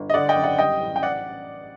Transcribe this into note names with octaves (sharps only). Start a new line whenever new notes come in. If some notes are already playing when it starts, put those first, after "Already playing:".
Already playing: G1
D#5
D3 D5 F#5
D#5 G5
F#1
D5 F#5
G3 D#5 G5
A1
G5
D5 F#5